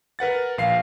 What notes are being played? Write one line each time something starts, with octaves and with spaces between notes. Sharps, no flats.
A#4 B4 F#5 A6
A#1 F5 C7